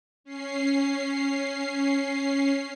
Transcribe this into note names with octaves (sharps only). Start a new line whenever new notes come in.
C#4 C7